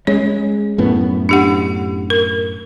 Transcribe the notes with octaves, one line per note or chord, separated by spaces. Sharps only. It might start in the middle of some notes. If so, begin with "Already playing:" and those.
G#3 C#4 C#5
F#2 A2 B3
D4 G4 F#5
A#4